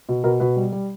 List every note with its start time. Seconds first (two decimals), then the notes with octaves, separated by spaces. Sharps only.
0.09 B2
0.24 B2 A#4
0.40 B2 B4
0.56 G3
0.72 G3